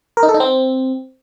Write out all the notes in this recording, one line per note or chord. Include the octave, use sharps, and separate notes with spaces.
A#4
D#4
A4
D#4
C4